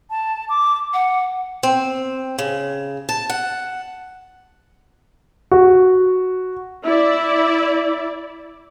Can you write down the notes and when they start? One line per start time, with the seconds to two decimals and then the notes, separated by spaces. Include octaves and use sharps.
0.10 A5
0.49 D6
0.93 F#5
1.63 C4
2.39 C#3
3.09 A5
3.30 F#5
5.51 F#4
6.85 E4 D5